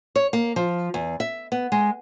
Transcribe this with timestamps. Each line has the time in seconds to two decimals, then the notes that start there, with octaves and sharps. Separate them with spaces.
0.16 C#5
0.33 A#3
0.56 F3
0.94 E2
1.20 E5
1.52 B3
1.72 G#3